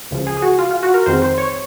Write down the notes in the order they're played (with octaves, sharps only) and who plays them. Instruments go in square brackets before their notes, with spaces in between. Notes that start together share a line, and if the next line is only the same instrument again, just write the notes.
[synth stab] C#2 C#3 F3
G#4
G#4
F#4
F4
F4
F#4
A#4
F2 D#3 G#3 C4 C5
C5
C#5